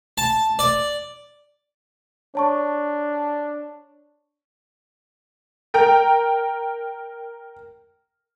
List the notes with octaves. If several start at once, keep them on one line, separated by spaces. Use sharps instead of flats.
A5
D5
D4 C#5 A5 C#6
A#4 G5 A#5